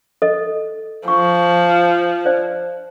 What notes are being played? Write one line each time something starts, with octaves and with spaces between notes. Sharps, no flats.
A4 D#5
F3 C#6
C5 D5 A5